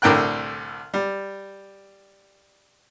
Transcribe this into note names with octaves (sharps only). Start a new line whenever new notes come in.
C2 A2 D3 A#4 G5 F#6
G3